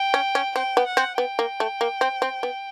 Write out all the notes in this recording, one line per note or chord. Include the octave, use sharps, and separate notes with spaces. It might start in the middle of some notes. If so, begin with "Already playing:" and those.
Already playing: G5
C#4
C#4
C4 G5
B3
F#5
C4
B3 G5
A#3
A3
A#3
C4
C4
B3